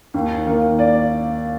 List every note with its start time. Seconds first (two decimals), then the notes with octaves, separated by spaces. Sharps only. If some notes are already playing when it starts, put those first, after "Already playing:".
0.14 D#2
0.47 D#3 A#3
0.79 D5